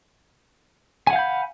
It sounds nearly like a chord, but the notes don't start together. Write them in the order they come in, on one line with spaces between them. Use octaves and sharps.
G#5 F#5 F5 G6 B5